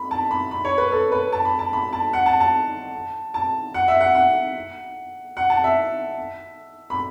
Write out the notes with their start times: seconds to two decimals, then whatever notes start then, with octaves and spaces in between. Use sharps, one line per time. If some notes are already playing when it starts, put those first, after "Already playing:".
Already playing: B5
0.11 A5
0.31 B5
0.51 B5
0.65 C#5
0.78 B4
0.92 A4
1.12 B4
1.32 A5
1.45 B5
1.59 A5
1.73 B5
1.93 A5
2.13 F#5
2.26 A5
2.40 A5
3.34 A5
3.74 F#5
3.88 E5
4.01 F#5
4.15 F#5
5.37 F#5
5.50 A5
5.64 E5
6.90 B5